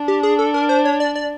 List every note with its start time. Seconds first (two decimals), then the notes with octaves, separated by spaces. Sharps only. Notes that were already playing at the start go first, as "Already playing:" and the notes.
Already playing: D4
0.08 G4
0.23 G#4
0.39 A4
0.54 A#4
0.69 C5
0.85 C#5
1.00 D5
1.15 D5